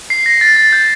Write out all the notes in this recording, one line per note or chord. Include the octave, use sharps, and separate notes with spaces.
C7
A#6
A6
A6
G6